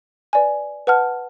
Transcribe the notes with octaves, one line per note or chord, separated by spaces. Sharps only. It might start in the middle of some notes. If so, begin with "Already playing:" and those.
B4 D5 G#5
B4 F#5 A5 F6